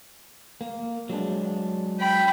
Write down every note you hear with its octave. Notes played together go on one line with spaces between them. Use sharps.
A#3
F#3 G#3 D4
G5 B5